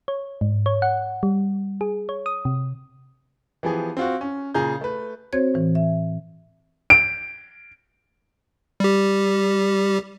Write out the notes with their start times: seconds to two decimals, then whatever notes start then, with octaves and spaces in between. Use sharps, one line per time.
0.08 C#5
0.41 G#2
0.66 C#5
0.82 F#5
1.23 G3
1.81 G#4
2.09 C#5
2.26 D#6
2.45 C3
3.63 E3 F3 B3 G4 G#4
3.97 C4 F4 F#4
4.21 C#4
4.54 A#2 C#3 G#4 A#5 G6
4.81 A3 B4
5.33 C4 F#4 C5 C#5 G#6
5.54 A2 E3
5.75 E5
6.90 D7
8.80 G3 G4